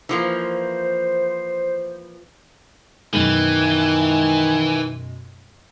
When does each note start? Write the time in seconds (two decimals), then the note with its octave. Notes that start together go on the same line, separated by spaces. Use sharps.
0.09 E3 F3 A#3 C5
3.13 F#2 B2 D#3 E3 G#3